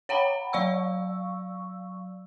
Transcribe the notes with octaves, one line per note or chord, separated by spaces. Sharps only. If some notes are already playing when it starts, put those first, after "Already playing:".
C#5 F#5 G5 A#5 B5
F#3 D5 F5 C#6 E6